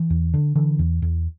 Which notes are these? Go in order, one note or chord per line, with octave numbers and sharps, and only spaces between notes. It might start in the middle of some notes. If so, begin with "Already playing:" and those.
Already playing: E3
E2
D3
D3 E3
E2
E2